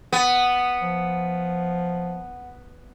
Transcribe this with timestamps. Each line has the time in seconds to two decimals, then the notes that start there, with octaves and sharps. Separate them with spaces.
0.13 B3
0.82 F3